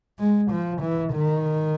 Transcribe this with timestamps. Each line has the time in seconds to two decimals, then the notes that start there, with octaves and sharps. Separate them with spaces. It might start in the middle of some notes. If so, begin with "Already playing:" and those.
0.19 G#3
0.51 F3
0.81 E3
1.13 D#3